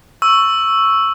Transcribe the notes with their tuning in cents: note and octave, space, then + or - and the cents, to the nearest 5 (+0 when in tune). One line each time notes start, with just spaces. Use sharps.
C#6 +0 E6 +0